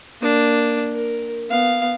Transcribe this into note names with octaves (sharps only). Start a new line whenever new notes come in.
A#3 D4
A#4
B3 F5